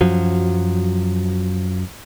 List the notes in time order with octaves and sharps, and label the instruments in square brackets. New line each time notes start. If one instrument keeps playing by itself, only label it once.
[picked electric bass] F#2 F3 F#3